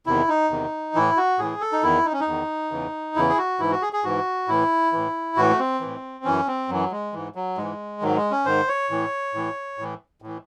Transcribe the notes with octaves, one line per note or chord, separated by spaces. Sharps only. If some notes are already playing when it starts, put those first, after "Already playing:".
E2 C3 D#3 E4
D#4
E2 C3 D#3
A2 E3 E4
F#4
A2 E3 G#4
A4
D#4
E2 D#3 E4
D#4
C#4
D#4
E2 D#3
E2 C#3 E3
E2 C#3 E3 E4
G#4
F#4
G#2 E3 E4
F#4
G#4
G#4
G#2 E3 F#4
A2 E3 E4
A2 E3
A2 E3 F#4
A3
C4
A2 E3
F#2 E3 C#4
C4
F#2 E3 F#3
G#3
G#2 E3
F#3
G#2 E3 G#3
G#2 D#3 F#3
G#3
C#4
G#2 D#3 C5
C#5
A2 E3
A2 E3
A2 E3
A2 E3